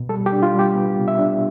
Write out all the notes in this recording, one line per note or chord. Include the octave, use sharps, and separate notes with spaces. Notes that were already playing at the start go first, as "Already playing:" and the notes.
Already playing: B2
G3 A4
G4
D4
F4
G3
G4
B3
C3
E5
D4